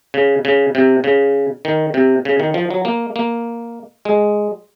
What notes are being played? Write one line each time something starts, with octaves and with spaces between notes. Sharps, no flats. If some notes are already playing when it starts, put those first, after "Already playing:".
C#3
C#3
C3
C#3
D#3
C3
C#3
D#3
F3
F#3
A#3
A#3
G#3